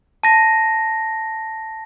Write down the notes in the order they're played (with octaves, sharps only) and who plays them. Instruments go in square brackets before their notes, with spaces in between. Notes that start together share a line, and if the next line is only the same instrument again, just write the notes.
[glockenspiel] A5 A#6